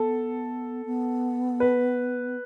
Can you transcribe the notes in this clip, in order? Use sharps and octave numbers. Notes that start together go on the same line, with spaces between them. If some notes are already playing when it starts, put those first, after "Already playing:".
Already playing: B3 A4
B3
B4